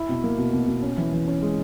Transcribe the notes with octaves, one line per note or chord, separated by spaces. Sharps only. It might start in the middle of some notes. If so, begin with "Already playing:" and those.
Already playing: E4
B2
A#3
B2
B2
B2
C#4
E3
E3
C#4
G#3